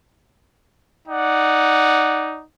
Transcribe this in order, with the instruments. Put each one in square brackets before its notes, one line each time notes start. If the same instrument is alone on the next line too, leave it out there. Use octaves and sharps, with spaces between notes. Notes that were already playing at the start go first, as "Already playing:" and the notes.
[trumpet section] D#4 D5 F#5